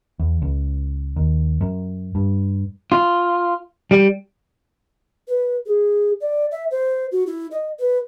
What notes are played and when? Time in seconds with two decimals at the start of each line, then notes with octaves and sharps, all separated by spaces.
0.19 E2
0.42 C#2
1.16 D#2
1.61 F#2
2.15 G2
2.92 F4
3.91 G3
5.27 B4
5.66 G#4
6.21 D5
6.51 E5
6.71 C5
7.12 F#4
7.27 E4
7.51 D#5
7.79 B4